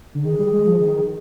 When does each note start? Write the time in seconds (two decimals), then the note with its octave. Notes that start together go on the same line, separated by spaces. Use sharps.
0.15 D3
0.24 D#3 G#4
0.39 G3
0.53 G#3
0.67 F3
0.81 D#3